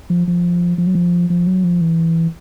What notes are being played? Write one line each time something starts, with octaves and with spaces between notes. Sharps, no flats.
F3
F3
F3
F#3
F3
F3
F#3
F3
E3